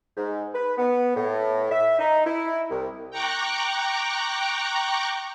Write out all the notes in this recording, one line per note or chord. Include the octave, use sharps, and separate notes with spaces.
G#2
B4
B3
A2
E5
D#4
E4
C2
G5 A#5 C#6 D6 F#6